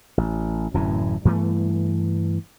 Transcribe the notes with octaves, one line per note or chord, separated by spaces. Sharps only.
A1
D1 F#2 A2 E3
G2 E3 A3 B3